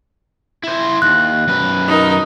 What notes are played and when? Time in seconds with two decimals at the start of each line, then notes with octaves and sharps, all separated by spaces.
0.63 E4 C5
1.02 D#2 F#6
1.48 F#2 B4
1.88 D#4 A#4